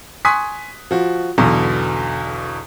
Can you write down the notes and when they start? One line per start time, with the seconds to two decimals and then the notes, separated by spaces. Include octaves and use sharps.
0.25 G#5 C6 C#6 D#6 F#6 B6
0.91 F3 F#4
1.38 B1 E2 B2 D3